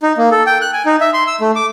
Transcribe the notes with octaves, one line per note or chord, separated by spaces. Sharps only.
D#4
A#3
A4
G5
F#6
G#5
D#4
E5
C6
E6
A3
D6